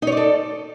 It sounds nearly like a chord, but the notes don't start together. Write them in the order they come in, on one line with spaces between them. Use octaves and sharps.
D#4 C#5 D5 A4